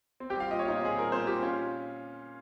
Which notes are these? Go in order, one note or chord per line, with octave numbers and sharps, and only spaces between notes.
C4
G4 G5
G3 F4 F5
A#2 D#5
C#5
A#2 D#4 D#5
C4 G#4
G3 A#4
A#2 C4 C5
A#2 G4
C#4 F4